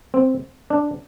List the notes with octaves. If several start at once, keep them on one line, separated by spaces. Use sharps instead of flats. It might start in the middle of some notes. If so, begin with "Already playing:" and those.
C4
D4